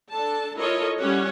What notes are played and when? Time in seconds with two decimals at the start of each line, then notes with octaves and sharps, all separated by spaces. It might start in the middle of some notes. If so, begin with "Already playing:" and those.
0.11 D4 A4 A5
0.58 E4 F4 A4 A#4 C#5 D#5
0.98 G3 C#4 E4 G4 C#5 F#5